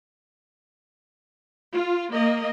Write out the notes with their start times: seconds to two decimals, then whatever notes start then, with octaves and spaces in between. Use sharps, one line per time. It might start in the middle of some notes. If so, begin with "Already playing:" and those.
1.73 F4
2.11 A#3 D#5